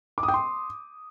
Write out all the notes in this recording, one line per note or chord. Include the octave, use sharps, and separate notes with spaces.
D6
D#6
G5
C6